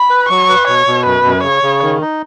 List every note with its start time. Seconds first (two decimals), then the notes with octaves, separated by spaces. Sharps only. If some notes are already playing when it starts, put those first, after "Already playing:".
Already playing: B5
0.10 B4
0.29 F#3 C#6
0.49 B4
0.68 B2 C#5
0.87 B2
1.06 F#2 B4
1.25 F#2
1.43 C#3 C#5
1.63 C#3
1.82 D#3
2.01 D#4